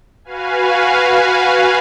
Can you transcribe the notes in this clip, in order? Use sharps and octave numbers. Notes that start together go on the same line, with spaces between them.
F#4 B4 F5 G#5